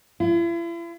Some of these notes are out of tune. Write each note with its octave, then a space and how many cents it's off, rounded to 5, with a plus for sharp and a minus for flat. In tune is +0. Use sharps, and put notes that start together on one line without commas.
E4 +45